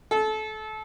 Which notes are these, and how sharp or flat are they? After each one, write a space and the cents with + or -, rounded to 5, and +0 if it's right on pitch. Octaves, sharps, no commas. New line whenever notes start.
A4 -25